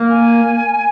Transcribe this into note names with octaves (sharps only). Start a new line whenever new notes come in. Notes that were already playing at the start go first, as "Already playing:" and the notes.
Already playing: A#3
G#5